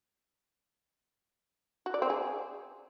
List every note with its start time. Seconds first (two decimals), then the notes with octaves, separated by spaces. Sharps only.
1.86 F#4
1.94 D5
2.02 C4
2.10 G#4